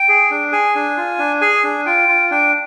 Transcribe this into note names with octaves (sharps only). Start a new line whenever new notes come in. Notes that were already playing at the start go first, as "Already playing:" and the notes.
Already playing: G5
G#4
D4
G#4 G#5
D4
F4
D4
G#4 G#5
D4
F4 G5
F4
D4 G5